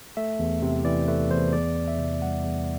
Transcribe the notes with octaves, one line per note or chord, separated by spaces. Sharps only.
A3 E5
E2
C3
E3 D5
A3 B4
E2 C5
E2 D5
E2
E5
C3
G3 F#5
E2